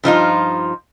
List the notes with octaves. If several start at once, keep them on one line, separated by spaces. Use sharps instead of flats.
G2 F3 D#4 F4